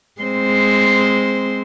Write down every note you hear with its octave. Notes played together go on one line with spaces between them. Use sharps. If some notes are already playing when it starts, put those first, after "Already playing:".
G#3 C4 C5